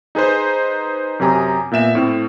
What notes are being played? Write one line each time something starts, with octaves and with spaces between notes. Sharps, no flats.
D#4 G#4 B4 C5
F#2 C3 G4 G#5 A#5 D#6
A#2 B3 E5 E7
A2 C4 F6